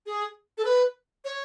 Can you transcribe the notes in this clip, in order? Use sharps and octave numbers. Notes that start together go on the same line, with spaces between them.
G#4
A4
B4
C#5